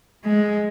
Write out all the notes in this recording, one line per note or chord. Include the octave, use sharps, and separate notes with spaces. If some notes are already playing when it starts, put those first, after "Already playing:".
G#3